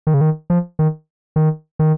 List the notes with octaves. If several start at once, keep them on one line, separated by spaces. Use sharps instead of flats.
D#3
C#3
D#3
F3
D#3
D#3
D#3